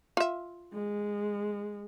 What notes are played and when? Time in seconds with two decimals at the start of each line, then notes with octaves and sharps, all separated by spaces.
0.17 F4 E5
0.74 G#3